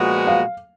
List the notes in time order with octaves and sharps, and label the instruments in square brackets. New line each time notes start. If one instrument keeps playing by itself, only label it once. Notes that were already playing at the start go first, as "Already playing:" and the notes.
Already playing: [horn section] A#2 F3 G#3 B3 F#4
[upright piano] F5